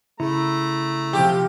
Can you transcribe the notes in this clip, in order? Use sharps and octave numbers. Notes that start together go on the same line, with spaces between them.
C#3 A3 E4 A#5
C3 F3 G4